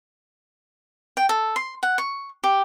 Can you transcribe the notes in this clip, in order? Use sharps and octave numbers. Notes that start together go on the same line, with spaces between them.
G5
A4
C6
F#5
C#6
G4